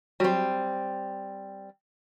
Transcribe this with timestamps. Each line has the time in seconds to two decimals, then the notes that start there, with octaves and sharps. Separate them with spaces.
0.20 F#3 G3 C4